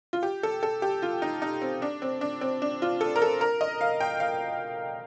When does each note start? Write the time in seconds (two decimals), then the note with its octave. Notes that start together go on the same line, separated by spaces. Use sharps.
0.13 F4
0.23 G4
0.43 A4
0.63 A4
0.82 G4
1.02 F4
1.22 D#4
1.42 D#4
1.62 C4
1.82 D4
2.02 C4
2.21 D4
2.41 C4
2.62 D4
2.82 F4
3.01 A4
3.16 A#4
3.22 A4
3.41 A#4
3.61 D#5
3.81 F5
4.00 G5
4.20 F5